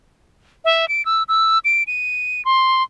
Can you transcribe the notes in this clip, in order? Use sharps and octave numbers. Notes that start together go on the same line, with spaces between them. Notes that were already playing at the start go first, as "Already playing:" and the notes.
E5
D7
E6
E6
D7
D#7
C6